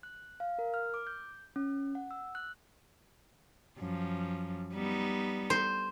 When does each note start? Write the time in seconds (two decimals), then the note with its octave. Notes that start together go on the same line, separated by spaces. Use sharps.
0.03 F#6
0.40 F5
0.59 A#4
0.74 F6
0.94 D6
1.07 G6
1.56 C#4
1.95 F#5
2.11 E6
2.35 F#6
3.78 F#2 F3
4.73 G3 B3 D#4
5.50 C5